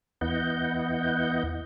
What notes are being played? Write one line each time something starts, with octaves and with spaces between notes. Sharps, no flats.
E2 B3 E4 D#5 F#5 G6